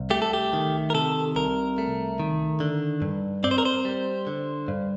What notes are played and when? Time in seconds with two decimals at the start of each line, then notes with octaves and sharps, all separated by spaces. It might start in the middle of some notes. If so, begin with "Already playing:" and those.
Already playing: C2
0.10 A3 G4
0.22 A4
0.33 G4
0.53 D#3
0.90 A#4
0.94 C3 A4
1.36 C2 A#4
1.78 A3
2.20 D#3
2.60 D3
3.02 G2
3.44 C4 D5
3.51 C5
3.58 A#4
3.65 C5
3.85 G3
4.27 D3
4.68 G2